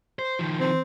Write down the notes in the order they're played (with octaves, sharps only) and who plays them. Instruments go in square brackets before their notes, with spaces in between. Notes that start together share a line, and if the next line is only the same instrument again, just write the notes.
[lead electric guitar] C5
D#3 F3
[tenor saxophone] C4